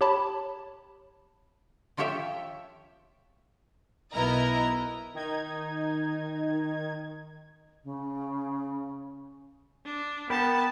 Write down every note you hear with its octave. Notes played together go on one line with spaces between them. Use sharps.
G4 C#5 A5 B5
F3 F4 G4 C#5 E5 G5
B1 B3 E4 A#4 D#5 A#5
D#3 D#4 G#6
C#3
D4
B3 A#4 G5 A5 B5